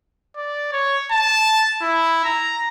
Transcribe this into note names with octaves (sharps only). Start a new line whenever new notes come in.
D5
C#5
A5
E4
A#5